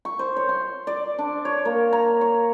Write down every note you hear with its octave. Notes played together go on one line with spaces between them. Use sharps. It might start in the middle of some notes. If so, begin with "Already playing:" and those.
C#6
C5
C#5
C6
D5
D4
C#5
A#3
A#5
C#5